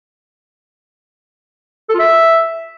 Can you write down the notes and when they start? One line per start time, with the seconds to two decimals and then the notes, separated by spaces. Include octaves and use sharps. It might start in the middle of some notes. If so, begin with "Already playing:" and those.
1.89 A4
1.94 F4
2.00 E5